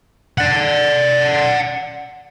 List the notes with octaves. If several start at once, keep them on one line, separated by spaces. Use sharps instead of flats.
D5 F#5